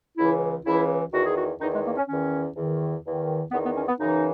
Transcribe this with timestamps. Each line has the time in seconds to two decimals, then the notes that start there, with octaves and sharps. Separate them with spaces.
0.18 C#2 C#3 E3 E4
0.66 C#2 C#3 E3 E4
1.13 E2 D#3 F#4
1.25 G#4
1.37 F#4
1.61 E2 D#3 D#4
1.73 G#3
1.85 A#3
1.97 C#4
2.08 E2 D#3 C#4
2.56 E2 D#3
3.04 E2 D#3
3.52 E2 D#3 B3
3.63 B3
3.75 C#4
3.88 B3
3.99 F#2 C#3 E3 D#4